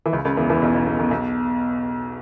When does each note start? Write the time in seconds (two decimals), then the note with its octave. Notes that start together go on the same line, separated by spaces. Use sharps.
0.06 E3
0.13 C#2 C#3
0.25 C#2 C#3
0.37 E2 E3
0.50 E2 E3
0.62 B1 B2
0.74 B1 B2
0.87 B1 B2
0.99 B1 B2
1.11 B1 B2